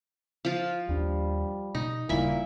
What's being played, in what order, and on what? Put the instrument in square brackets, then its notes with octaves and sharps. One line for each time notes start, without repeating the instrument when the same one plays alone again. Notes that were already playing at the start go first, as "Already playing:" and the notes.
[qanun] F3 F4
[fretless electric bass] D#2 D4 [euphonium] G3
[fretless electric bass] B2 [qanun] D#4
[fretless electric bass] D#1 C#3 G3 [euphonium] A#2 [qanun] E4 E5